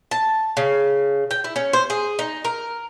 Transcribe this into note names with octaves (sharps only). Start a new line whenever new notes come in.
A5
C#3
G5
E4
C#4
C5
G#4
D#4
A#4